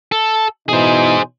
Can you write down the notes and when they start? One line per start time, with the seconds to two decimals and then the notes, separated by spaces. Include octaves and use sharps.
0.12 A4
0.69 B2 E3 D#4 G#4 C5